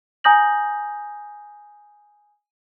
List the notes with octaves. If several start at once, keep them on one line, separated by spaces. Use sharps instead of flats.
G#5 A#5 D#6 G6 A#6 F#7